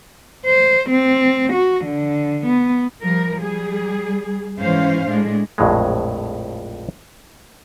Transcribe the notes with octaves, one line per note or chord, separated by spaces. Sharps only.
C5
C4
F#4
D3
B3
F3 G3 A#4
G3 G#4
G#2 E3 C#4 C5 F5
A2 G#3 D4
A#1 F2 A2 F#3 G#3